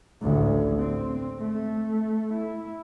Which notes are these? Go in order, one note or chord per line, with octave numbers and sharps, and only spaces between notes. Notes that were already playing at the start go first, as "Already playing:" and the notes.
A1 D2
C4
A3
E4